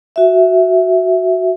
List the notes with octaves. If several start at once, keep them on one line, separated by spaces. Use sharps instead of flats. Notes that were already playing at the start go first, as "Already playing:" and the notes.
F#4 E5